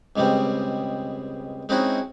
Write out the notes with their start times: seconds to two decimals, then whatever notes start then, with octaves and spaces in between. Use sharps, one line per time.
0.16 C#2 B2 G3 G#3 C4
1.69 G#3 C4 C#4 D#4 E4 F#4